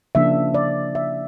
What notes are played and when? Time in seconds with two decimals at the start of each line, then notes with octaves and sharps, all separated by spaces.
0.15 C#3 F3 A#3 D4 E5
0.54 D5
0.95 E5